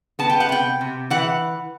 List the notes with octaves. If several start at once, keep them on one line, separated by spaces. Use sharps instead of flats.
B3 A5
G5
F#5
C3 G5
C3
E3 F#5